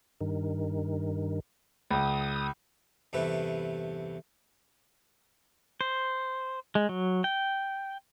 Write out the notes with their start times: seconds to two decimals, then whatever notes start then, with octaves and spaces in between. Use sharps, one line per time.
0.21 G2 D#3
1.91 C#2 D#6
3.13 E2 G2 C3 A3 B4
5.81 C5
6.75 G#3
6.89 F#3
7.24 G5